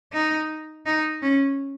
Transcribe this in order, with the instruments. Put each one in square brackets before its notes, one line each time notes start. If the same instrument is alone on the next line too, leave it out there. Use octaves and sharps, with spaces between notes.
[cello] D#4
D#4
C#4